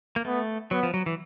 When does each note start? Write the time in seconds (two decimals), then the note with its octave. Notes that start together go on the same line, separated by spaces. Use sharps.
0.16 A#3
0.25 A3 B3
0.71 F#3 B3
0.83 F3
0.94 F#3
1.06 E3